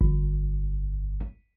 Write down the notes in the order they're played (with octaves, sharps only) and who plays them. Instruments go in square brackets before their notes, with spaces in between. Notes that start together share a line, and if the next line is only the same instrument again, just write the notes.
[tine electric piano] G1